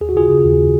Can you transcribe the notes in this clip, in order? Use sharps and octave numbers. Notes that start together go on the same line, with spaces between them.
D#2 G#4
F#4
C#3 F4 G#4
C#3
D#2